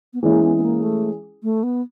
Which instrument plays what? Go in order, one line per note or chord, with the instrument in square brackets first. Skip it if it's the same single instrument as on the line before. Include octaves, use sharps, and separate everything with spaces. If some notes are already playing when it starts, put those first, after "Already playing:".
[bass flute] B3
[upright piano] E3 G#3 C#4 E4 G#4 [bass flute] A#3
[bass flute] B3
B3
A#3
A3
A3
B3